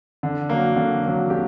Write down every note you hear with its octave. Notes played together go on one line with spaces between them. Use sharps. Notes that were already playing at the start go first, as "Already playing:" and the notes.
D3
F#3 A#3
D3
F#3 A#3
D3 G4